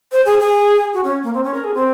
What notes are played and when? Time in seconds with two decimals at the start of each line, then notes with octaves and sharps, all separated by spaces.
0.12 C5
0.25 G#4
0.39 G#4
0.93 F#4
1.04 C#4
1.23 A#3
1.34 C4
1.44 C#4
1.54 A#4
1.64 G#4
1.75 C4